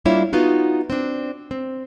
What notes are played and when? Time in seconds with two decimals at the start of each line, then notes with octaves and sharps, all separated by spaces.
0.05 G3 A#3 D4 E4 F4 C#5
0.33 B3 D#4 F4 F#4
0.90 C4 D4
1.51 C4